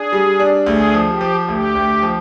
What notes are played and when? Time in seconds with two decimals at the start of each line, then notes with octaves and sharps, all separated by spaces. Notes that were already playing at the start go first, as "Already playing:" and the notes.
Already playing: D4 G#4
0.12 G3
0.40 D4
0.66 D2 G#4
0.94 F3
1.08 G4
1.21 F3
1.48 D2 G4
1.75 D2
2.03 F3